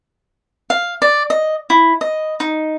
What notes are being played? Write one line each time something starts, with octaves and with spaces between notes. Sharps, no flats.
F5
D5
D#5
E4
D#5
D#4